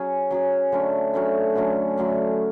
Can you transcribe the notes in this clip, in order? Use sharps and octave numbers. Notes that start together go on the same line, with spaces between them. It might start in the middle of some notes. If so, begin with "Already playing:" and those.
Already playing: F#3 C#4 G#4
F#3 C#4 G#4
D3 F#3 A3 C#4
D3 F#3 A3 C#4
D3 F#3 A3 C#4
D3 F#3 A3 C#4